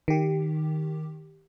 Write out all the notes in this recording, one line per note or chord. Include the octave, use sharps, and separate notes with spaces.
D#3 G4